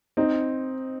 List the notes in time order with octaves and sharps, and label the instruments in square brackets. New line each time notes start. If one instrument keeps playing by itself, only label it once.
[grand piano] C4 [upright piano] D#4